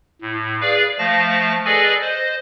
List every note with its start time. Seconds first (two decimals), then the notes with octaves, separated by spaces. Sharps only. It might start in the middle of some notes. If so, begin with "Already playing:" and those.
0.22 A2
0.61 G#4 B4 D5 F5
0.99 F3 A3 F5 A5 A#6
1.65 G#4 A4 B4 D5 D#5 G#5
2.02 C5 D#5